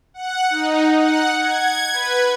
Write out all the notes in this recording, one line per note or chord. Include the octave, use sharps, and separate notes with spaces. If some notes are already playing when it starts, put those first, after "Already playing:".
F#5
D#4
F#5
G#6
B4